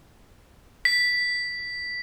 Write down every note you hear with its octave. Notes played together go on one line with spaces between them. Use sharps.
B6